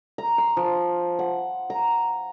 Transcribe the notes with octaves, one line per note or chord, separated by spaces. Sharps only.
A#5
C6
F3
F#5
A#5